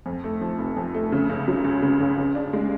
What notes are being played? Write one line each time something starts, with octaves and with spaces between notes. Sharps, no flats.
F2
A3
F3
F1
F2
A3
C#3
C#2
F#3
C#2
C#3
C#2
C#3
D4
G#3